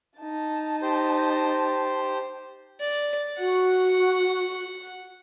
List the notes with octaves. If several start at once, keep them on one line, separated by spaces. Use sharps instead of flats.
D#4 A5
G4 C5
D5
F#4 F#5